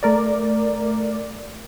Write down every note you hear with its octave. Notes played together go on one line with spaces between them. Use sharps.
A3 A#4 D5